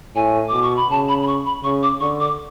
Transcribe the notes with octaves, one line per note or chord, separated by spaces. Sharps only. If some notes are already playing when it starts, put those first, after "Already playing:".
A2 G#5
B2 D6
C#6
B5
C#3 A5
B5
B5
C#6
B5
C#3 C#6
D6
D3 C#6
D6